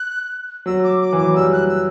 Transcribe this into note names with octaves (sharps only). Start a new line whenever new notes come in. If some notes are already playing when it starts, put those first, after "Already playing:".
Already playing: F#6
F#3 E6
D6
D6
E3
D6
F#3
G3 E6
F#6
E6